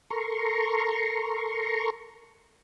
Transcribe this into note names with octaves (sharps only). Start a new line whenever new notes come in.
A4 A#4 A#5 C6 C#6